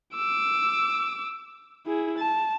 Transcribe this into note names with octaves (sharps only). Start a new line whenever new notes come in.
D6 E6
E4 G#4
A5